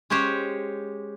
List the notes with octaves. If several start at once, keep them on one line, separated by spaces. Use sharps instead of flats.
G#3 C#4 G4 C5 C#5